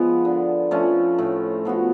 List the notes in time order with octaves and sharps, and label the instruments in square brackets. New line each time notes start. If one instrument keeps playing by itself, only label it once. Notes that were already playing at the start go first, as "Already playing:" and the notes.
Already playing: [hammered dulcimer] F3 G#3 B3
D3
F3 A3 C#4
A2
F3 B3 F#4